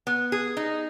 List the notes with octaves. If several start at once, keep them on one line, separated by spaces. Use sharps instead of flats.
B3
G#4
D#4